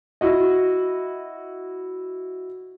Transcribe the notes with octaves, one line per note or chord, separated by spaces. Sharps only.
E4 F#4 D#5